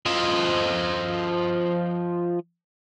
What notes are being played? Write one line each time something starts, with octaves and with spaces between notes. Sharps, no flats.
F3 D#5